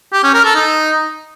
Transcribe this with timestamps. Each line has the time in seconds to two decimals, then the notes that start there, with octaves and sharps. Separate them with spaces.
0.13 G4
0.23 C#4
0.34 A#4
0.45 A4
0.55 D#4